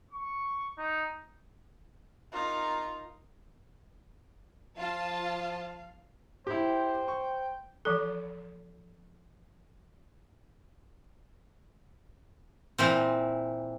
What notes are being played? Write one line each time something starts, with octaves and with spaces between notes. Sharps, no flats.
C#6
D#4
D#4 F4 A#4
F3 F4 F5 A5
E4 G4 C5 G5
C#6
E3 F3 A4
A#2 E3 C4